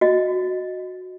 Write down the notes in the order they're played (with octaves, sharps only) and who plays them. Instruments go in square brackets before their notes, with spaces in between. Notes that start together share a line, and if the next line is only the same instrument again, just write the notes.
[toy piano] F#4 D#5